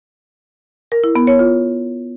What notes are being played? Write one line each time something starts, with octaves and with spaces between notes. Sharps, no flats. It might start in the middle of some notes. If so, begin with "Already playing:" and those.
A#4
E4
B3
C#5
F4